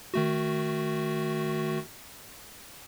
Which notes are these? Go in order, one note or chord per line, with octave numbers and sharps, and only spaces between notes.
D#3 A3 F#4